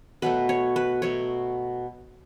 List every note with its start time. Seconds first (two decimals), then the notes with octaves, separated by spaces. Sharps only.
0.22 B2 F#3 A3 B4
0.49 C#5
0.76 B4
1.02 B2 F#3 A3 C#5